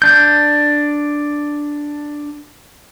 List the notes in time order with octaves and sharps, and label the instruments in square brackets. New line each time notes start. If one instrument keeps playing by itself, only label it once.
[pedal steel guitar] D4 G6